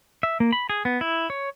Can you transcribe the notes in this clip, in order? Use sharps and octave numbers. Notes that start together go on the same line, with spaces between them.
E5
A#3
B5
G#4
B3
E4
C#5